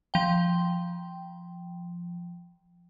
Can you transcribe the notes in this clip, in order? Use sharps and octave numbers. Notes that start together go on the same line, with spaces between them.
F3 G5